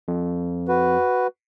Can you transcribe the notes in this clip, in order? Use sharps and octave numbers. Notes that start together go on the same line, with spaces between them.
F2
F#4 B4